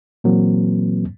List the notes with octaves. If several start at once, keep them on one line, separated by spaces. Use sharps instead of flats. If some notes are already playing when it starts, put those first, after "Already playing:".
A#2 E3 F#3 A#3 C4